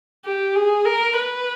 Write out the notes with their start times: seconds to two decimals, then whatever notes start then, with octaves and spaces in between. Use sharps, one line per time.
0.25 G4
0.56 G#4
0.85 A#4
1.16 B4